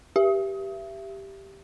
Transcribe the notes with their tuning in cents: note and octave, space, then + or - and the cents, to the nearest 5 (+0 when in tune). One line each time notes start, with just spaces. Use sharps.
G4 +0 E5 +30